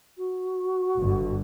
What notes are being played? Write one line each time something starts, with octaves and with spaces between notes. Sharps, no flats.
F#4
G1 G2 D3